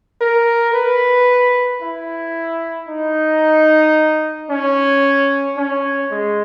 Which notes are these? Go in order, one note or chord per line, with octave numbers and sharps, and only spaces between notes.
A#4
B4
E4
D#4
C#4
C#4
G#3